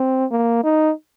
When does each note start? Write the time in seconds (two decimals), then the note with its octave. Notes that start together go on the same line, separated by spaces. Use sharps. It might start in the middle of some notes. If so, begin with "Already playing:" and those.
Already playing: C4
0.31 A#3
0.63 D#4